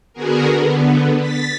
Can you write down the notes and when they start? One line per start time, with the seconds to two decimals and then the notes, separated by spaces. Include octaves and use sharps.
0.13 D3 B3 F#4 G#4 A#4
0.54 D3 B3
1.20 A6 B6